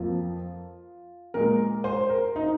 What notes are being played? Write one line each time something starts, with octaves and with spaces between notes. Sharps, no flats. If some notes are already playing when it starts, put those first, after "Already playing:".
Already playing: F2 F3 A#3 F4
A#2 G#3 A#4
C5
A#4
D#4